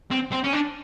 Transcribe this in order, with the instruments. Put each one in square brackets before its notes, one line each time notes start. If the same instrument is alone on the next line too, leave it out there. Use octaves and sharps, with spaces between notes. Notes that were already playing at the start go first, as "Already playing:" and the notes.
[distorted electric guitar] C4
C4
C#4
D4